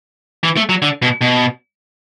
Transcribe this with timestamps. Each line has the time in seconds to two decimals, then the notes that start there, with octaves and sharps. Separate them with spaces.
0.43 E3
0.57 A3
0.69 F#3
0.82 D3
1.02 B2
1.21 B2